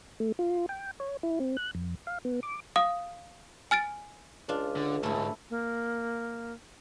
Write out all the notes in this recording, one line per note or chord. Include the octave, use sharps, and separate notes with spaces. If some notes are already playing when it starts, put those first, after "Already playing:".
A3
F4
G5
C#5
E4
C4
F#6
F2
F5
B3
D6
F5 D#6
G#5 F6 A6 D7
C#2 D4 F4
D3
D2 G#2 A3 E4
A#3